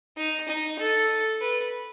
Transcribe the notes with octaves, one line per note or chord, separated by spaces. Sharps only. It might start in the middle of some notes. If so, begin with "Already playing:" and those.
D#4
D#4
A4
B4